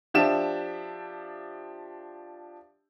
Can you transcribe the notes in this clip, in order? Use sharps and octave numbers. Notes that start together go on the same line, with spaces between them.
F3 D4 G4 E5 E7